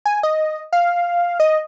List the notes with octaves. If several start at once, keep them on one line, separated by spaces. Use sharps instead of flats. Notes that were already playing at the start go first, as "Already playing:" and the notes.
G#5
D#5
F5
D#5